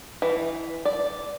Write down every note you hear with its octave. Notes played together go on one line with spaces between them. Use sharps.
E3
D5